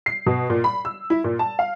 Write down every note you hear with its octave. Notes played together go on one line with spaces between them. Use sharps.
C7
B2
A#2
B5
E6
E4
A#2
A5
F5